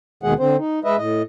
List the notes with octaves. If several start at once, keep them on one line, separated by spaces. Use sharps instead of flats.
D#2 B2 D#3 G#3 G#4 F#5
D3 C4 C5
D#4
G#3 B4 D#5 E5
A2 D#5